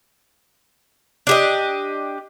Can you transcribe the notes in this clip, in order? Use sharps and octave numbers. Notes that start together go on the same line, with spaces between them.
D4 G4 D#5